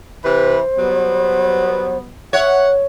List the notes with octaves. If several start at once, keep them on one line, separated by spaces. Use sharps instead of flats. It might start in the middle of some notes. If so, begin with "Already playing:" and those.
C3 E3 B4 C5
F#3 G3 B3
C#5 E5 F#5